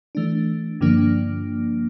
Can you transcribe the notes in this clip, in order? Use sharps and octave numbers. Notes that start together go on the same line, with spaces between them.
E3 A3 D4
G2 D3 F3 A#3 D4